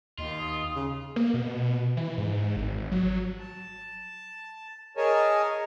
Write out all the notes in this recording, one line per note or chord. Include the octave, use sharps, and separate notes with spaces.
D#2 F4 D#5
D#6
C#3
A#3
B2
E3
G#2
G#1
F#3
A5
G#4 A#4 C#5 D#5 G#5 A5